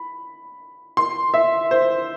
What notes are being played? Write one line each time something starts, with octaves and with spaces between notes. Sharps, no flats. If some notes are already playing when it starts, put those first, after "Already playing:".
Already playing: B5
C6
E5
C5